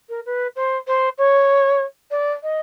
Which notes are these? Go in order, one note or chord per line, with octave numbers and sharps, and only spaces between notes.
A#4
B4
C5
C5
C#5
D5
D#5